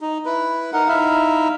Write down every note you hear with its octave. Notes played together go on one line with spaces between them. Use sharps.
D#4
E4 B4
D#4 A#4 F#5
D#4 E4 E5 F5